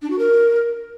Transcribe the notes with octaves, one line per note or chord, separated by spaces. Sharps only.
D4
F#4
A#4